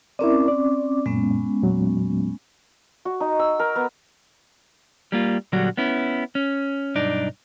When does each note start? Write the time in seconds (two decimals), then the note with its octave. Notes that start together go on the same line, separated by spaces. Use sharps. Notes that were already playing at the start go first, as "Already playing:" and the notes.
0.19 C4 C#4 E4 A#4 D5 D6
0.48 D5
1.06 F#2 A#2 G#3 B3 C#4
1.62 E2 A#2 F#3
3.05 F#4
3.20 D#4
3.39 E6
3.59 A#4
3.76 B3
5.12 G3 A#3 F4
5.52 A#2 D3 F#3 G3 D4 F#4
5.77 B3 C#4 E4
6.35 C#4
6.95 B1 G2 D4 D#4 D5